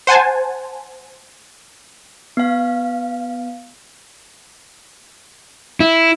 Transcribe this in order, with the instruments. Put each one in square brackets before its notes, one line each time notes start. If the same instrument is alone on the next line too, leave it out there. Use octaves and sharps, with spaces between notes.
[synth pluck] C5 F#5 G#5 A5
[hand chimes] B3 F5
[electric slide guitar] E4